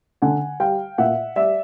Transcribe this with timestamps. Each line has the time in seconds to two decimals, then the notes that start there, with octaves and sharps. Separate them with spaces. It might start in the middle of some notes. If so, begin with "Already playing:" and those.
0.22 D3 F#5 G#5
0.60 G3 F5 G5
0.98 A#2 E5 F#5
1.36 G3 D5 E5